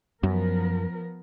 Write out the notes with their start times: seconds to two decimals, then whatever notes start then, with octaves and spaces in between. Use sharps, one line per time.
0.23 F#2 F3 B3 A#4